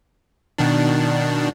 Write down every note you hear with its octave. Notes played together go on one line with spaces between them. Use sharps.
B2 D#3 D4